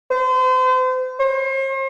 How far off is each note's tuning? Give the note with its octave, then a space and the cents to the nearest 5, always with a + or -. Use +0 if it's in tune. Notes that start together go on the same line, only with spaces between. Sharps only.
C5 -35
C5 +40